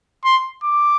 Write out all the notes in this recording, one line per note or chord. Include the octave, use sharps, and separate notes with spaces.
C6
D6